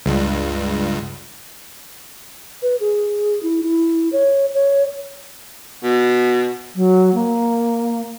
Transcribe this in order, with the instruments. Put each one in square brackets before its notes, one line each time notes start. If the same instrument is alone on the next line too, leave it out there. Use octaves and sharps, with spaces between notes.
[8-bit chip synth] C#2 G2
[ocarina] B4
G#4
E4
E4
C#5
C#5
[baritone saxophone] B2
[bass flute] F#3
A#3